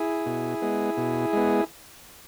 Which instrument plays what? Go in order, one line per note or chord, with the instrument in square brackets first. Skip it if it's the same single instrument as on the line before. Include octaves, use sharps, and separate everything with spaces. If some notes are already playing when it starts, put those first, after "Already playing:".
Already playing: [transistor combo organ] E4 G#4
B2
G#3 B3
B2
G#3 B3